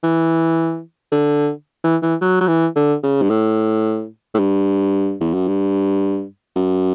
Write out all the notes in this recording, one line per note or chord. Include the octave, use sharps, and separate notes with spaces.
E3
D3
E3
E3
F#3
F#3
E3
D3
C#3
G2
A2
A2
G2
E2
F#2
G2
F#2